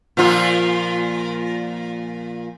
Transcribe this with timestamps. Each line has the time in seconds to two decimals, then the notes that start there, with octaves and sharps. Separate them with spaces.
0.17 A#2 F3 F4